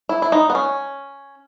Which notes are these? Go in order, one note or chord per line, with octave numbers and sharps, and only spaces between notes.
E4
E4
D#4
B3
C#4